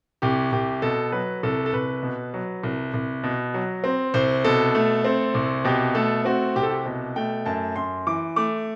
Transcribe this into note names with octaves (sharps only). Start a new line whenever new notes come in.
C2 G4
C2 G4
B2 A4
F#3 B4
C2 A4
A4
C2 B4
B2
F#3
C2
C2
B2
F#3
C4
C2 C5
B2 A4
A3
C4
C2
B2 G4
A3 A4
C4 F#4
C2 G4
A4
G4
B2
A3 G5
F#2 A5
F#2 C6
E3 D6
A3 D6